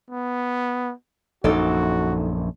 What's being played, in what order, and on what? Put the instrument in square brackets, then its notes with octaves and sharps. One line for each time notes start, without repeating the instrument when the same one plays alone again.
[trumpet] B3
[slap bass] A#1 F#2 [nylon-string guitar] D#4 A4 D5 [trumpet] F#4